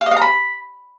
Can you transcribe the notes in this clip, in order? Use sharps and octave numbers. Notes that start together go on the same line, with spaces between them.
F5
D#5
F5
A#5
B5